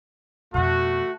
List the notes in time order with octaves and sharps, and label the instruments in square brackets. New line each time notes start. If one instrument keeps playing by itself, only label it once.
[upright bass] F2 B2 [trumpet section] A3 F#4